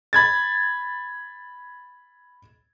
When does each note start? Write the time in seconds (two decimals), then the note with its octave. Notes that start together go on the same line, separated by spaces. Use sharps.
0.13 B5 G#6 A6